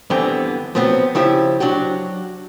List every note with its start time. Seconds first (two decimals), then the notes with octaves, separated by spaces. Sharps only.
0.10 G2 D3 E3 B3 C4 G5
0.75 F3 F#3 B3 C4
1.15 C#3 F3 E4 G4
1.60 F#3 D4 F#4 G4